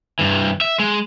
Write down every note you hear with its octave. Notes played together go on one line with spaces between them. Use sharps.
G2 E3
E5
G#3